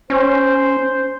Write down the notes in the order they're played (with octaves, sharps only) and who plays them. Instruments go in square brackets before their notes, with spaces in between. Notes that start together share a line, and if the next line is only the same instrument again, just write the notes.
[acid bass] C#4 [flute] C5